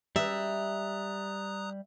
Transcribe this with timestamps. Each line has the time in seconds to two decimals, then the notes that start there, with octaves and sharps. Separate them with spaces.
0.16 G3 E5 A#5 D#6 F#6